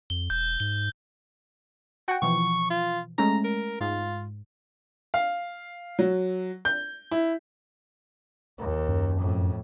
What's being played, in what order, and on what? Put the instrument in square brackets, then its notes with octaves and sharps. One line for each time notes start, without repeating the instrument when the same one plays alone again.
[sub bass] F2 [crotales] G7
[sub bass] E1 [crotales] G6
[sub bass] G#2 [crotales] G7
[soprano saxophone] F#4 [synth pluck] F#5 G5
[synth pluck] B2 E3 F3 [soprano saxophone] C#6
[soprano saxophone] F4
[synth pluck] G#3 A3 C#4 [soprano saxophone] A#5
[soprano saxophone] A#4
[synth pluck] G#2 [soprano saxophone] F4
[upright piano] F5
F#3
G6
E4
[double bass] D#2
[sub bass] F#2
[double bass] F2 A2